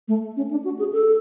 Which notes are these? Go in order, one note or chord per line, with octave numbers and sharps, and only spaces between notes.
A3
C#4
D4
F#4
G#4
A4